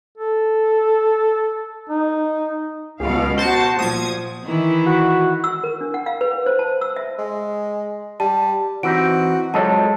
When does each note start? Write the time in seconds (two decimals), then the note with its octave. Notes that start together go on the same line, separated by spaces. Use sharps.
0.18 A4
1.89 D#4
3.00 C#2 B2 F5
3.38 F#4 C5 A5
3.79 A#2 F3 D#6 G#6
4.44 D#3 E3 E4
4.86 F#4
5.44 E6
5.64 A#4
5.81 D4
5.94 F#5
6.06 F5
6.21 B4
6.46 C5
6.59 A5
6.81 E6
6.96 E5
7.18 G#3
8.20 G3 A5
8.83 E3 C4 D#4 F#4 D7
9.54 F2 F#3 G#3 A4 C#5 D#5 A5